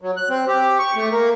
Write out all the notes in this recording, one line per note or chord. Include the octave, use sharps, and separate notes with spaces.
F#3
F#6
C4
G4
C#6
A3
A#3